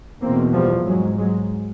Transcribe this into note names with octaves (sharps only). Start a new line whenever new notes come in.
E2 B2 A#3 C4
F3 G3
G#2 F#3 G#3
F#3 G#3